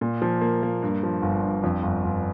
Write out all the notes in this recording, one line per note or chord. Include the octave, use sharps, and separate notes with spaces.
A#2
F3
A#3
A#3
G2
F3
G1
G2
F2
G1
G1